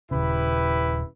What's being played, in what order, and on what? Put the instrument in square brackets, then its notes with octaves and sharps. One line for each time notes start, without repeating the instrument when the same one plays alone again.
[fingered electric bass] D#1 C#3 [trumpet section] E4 G4 B4